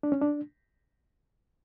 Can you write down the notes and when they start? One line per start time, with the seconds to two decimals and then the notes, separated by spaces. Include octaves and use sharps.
0.03 D4
0.12 C#4
0.21 D4